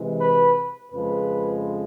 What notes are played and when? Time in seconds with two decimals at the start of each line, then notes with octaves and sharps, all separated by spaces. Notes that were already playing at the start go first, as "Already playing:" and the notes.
Already playing: C3 E3 G#3
0.21 B4
0.91 F2 C#3 F3 G#3 B4